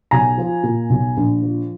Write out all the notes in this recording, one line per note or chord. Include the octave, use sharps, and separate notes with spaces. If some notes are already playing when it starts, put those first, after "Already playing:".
B1 G#5 A#5
F3
A#2
B1
A#1
F3